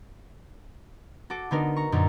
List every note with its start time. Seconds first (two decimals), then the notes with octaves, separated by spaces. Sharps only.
1.30 F#4 A4 D6
1.51 D3 B3 D#4 F#4 A#4
1.76 A#5 C#6
1.92 F#2 A#2 D3 C4 D#4